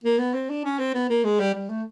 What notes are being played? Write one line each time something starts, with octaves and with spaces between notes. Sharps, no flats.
A#3
B3
C4
D4
C#4
C4
B3
A#3
G#3
G3
G3
A3